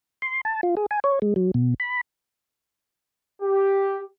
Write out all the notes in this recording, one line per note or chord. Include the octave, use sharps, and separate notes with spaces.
C6
A5
F4
G#4
G#5
C#5
G#3
F#3
B2
B5
G4